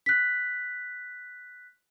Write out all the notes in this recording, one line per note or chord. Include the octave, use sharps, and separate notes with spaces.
F#6 B6